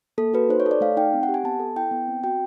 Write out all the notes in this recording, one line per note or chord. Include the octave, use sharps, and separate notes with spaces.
A#3 A4
F#4 B4
D#4 C5
C#5
A4
D5
A3 F5
D#4 G5
C4
F#5
G4
G#5
B3 A5
A4
E4 G5
B3
C4
F#4 G5